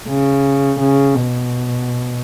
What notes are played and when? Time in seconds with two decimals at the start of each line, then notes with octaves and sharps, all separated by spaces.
0.08 C#3
0.79 C#3
1.16 B2